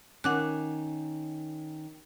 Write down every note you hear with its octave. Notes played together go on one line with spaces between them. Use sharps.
D#3 C#4 F#5 D6 F#6